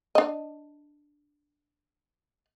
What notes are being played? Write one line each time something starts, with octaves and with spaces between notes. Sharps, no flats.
D4 D#5